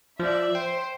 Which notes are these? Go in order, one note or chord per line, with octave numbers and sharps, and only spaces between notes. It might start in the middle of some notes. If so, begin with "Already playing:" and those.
F3 D5 E5
C5 G5